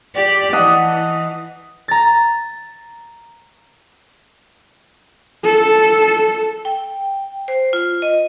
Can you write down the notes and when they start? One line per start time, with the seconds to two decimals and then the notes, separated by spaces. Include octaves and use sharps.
0.15 G4 D5
0.53 E3 D#5 F#5 A5
1.88 A#5 A6
5.44 A4
6.65 G5
7.48 C5
7.73 F4
8.02 D#5